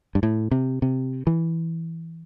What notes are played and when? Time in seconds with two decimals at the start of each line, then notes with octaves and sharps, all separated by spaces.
0.15 G2
0.23 A2
0.51 C3
0.82 C3
1.27 E3